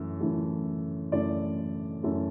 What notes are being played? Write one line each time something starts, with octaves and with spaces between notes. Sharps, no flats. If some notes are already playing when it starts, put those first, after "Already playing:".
Already playing: F#2 E3 A3
F#2 E3 A3
F#2 E3 A3 D5
F#2 E3 A3